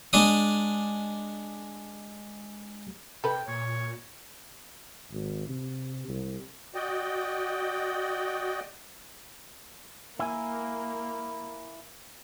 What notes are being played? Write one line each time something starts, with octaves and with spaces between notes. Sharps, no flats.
G#3 D4 D#6
C3 A4 B4 G5
A#2 C#5
G#1
C3
C2
F#4 D5 D#5 G5
A#3 E4 G#5